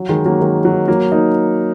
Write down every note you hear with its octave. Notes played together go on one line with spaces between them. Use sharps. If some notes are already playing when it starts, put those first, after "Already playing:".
Already playing: F#3
D#3 G#3
F#3 A#3
D#3 G#3
F#3
F#3 A#3
A#3 D#4